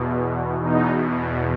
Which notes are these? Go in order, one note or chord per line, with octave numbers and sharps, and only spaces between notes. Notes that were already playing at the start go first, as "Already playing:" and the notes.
Already playing: E2 B2
E2 B2 D#4